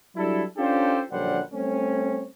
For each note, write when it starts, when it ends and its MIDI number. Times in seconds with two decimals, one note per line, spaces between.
0.16 0.42 54
0.16 0.42 55
0.16 0.42 62
0.16 0.42 64
0.16 0.42 69
0.57 1.01 61
0.57 1.01 62
0.57 1.01 65
0.57 1.01 67
0.57 1.01 69
0.57 1.01 72
1.11 1.40 34
1.11 1.40 42
1.11 1.40 50
1.11 1.40 55
1.11 1.40 72
1.11 1.40 78
1.53 2.26 55
1.53 2.26 57
1.53 2.26 60
1.53 2.26 61